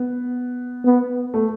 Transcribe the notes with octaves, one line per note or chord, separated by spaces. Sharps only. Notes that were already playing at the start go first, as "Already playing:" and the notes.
Already playing: B3
B3
A3